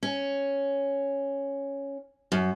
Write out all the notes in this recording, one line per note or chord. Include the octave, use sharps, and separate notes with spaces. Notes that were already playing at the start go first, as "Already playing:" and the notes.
C#4
F#2